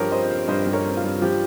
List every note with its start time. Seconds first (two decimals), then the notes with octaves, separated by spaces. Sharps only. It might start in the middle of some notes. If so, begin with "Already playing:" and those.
Already playing: G2 F3 G4 A#4 C#5
0.11 C4 C5 D#5
0.31 C4
0.48 G2 C5 D#5
0.67 G2
0.73 A#4 C#5
0.85 C4
0.97 F4
1.04 G2
1.22 F3 G4